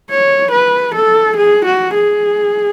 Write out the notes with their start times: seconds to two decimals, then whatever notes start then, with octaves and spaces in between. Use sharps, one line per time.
0.10 C#5
0.52 B4
0.95 A4
1.37 G#4
1.66 F#4
1.94 G#4